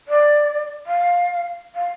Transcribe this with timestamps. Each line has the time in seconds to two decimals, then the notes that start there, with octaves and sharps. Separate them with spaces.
0.08 D5
0.87 F5
1.75 F5